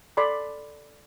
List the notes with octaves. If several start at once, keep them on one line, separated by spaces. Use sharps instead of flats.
A4 D5 B5 C6